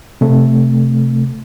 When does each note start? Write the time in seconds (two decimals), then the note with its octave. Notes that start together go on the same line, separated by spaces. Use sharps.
0.21 C3 A3